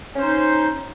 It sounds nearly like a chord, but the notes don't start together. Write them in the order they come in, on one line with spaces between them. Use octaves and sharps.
C#4 C5 D#4